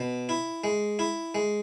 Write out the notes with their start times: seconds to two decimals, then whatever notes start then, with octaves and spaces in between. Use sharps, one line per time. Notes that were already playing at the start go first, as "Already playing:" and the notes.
Already playing: B2
0.29 E4
0.64 G#3
0.99 E4
1.35 G#3